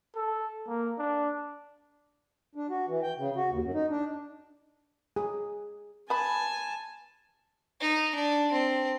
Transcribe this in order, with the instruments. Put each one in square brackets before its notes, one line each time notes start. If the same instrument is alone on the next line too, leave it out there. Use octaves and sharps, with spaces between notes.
[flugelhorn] A4
A#3
D4
[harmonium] D4
F#4
E3
G5
C#3
F#4
D#2
F#2
D#4
D4
[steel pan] G#4
[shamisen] B4 B5 [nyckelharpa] G#5 A5
[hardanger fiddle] D#4
D4
C4